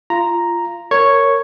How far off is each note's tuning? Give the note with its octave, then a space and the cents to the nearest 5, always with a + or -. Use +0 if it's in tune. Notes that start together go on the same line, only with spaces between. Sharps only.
F4 -20 A#5 +0
A#4 -10 C#5 +0 C#6 +0